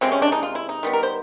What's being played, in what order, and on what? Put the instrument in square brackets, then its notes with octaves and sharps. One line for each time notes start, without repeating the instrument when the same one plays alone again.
[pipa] C3 F3 G#3 C4
C#4
D4
D#4
F4
E4
D#4
D#3 G3 B3
A#4
C5